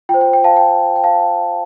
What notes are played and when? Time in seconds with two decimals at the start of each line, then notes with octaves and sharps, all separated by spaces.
0.09 F4 G5
0.14 C5
0.21 G5
0.33 G5
0.44 F5 A5
0.57 G5
0.96 G5
1.04 F5 A5